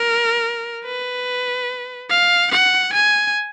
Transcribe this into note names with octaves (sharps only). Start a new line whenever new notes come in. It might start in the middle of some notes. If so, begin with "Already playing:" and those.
Already playing: A#4
B4
F5
F#5
G#5